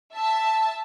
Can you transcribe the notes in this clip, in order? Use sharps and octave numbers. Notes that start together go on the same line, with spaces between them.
E5 A5